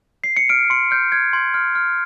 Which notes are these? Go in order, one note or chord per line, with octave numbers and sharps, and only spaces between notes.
C7
C#7
F6 D7
C6 C#7
F6 G6
F6 G#6
C6 G#6
F6
F6